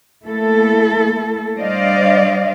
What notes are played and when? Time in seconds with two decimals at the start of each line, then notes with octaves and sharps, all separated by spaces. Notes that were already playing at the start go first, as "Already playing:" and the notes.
0.25 A3 A#3 E4 A4
1.56 G3 D4 C5 D5 D#5 F5